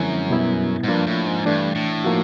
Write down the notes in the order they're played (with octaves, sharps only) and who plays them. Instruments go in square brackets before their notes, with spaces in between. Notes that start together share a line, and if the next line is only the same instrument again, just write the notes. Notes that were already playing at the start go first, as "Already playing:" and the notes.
Already playing: [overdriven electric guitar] F#2 [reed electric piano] D3 F3 G#3 C4 E4
[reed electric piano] B2 G3 B3 E4
[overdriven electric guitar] G#2
[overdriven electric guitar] G2 [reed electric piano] F3 A#3 D4 F4
[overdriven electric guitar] A2
G#2
[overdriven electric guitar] G2 [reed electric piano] E3 A3 D4
[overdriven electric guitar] A2
[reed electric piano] F3 A#3 D#4 F#4